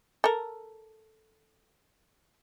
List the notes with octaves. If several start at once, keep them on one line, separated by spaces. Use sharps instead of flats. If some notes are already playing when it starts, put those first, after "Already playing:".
A4 A#4